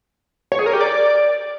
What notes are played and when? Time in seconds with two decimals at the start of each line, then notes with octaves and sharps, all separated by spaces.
0.52 C#5
0.59 G#4
0.66 A#4
0.73 G4
0.81 D5